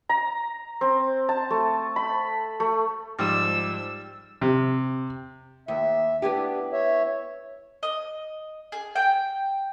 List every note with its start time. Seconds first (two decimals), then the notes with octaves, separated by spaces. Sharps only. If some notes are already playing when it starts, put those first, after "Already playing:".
0.09 A#5
0.81 C4
1.29 A5
1.50 A3
1.96 B5
2.60 A3
3.19 G#2 F3 G3 E6
4.41 C3
5.68 D#2 E5
6.22 B3 D4 E4 G4
6.72 C#5 E5
7.83 D#5
8.72 G#4
8.95 G5